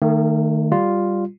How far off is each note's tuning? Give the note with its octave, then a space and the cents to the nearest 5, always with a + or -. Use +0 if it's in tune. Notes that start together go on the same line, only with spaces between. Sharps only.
D#3 -15 A3 +30
G3 +0 F4 +0